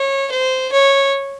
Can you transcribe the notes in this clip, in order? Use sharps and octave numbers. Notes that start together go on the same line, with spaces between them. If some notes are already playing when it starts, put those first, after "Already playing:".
Already playing: C#5
C5
C#5